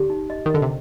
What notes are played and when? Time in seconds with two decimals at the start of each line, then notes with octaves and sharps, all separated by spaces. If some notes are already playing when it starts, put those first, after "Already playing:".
Already playing: D3 G4
0.10 D#4
0.30 D#5
0.46 D#3
0.50 D3 D#5
0.62 C3